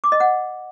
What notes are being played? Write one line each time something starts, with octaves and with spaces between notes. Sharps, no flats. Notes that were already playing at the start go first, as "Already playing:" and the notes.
D6
D#5
F#5